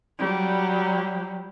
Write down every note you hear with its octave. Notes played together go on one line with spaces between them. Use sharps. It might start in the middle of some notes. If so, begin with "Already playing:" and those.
F#3 G3